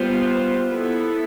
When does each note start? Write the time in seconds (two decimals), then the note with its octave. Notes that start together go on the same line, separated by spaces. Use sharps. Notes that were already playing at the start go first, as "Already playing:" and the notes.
Already playing: G3 B3 F4 C5
0.69 B3 E4 A4